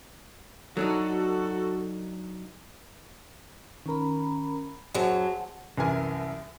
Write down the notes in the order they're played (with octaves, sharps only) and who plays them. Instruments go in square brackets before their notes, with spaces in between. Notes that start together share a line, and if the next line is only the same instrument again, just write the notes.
[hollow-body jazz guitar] F#3 D4 D#4 [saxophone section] F#4 A4
[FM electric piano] D#3 A#4 [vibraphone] C#4 A#5 B5
[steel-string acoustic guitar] F#2 F#3 [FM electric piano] G#4 C5 [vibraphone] F#5 A5
[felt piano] C2 F#2 E3 A#4 G#5